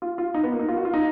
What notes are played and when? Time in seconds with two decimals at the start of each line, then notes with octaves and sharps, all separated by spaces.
0.02 F4
0.18 F4
0.34 D#4
0.43 B3
0.52 A#3
0.59 D#4
0.68 F4
0.77 F#4
0.85 F4
0.94 D#4